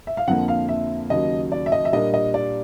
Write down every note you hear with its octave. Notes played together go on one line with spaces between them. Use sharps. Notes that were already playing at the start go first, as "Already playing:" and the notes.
E5
F5
F2 D3 F3 A#3 F#5
F5
E5
D#2 C#3 F#3 D#5
D5
E5
D#5
E5
A#2 G3 A#3 D4 D#5
D#5
D5